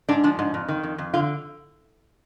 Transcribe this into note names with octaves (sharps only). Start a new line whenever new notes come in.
G#2 D4
F3 D4
G#2
F2
D#3
F2
F2
D3 F4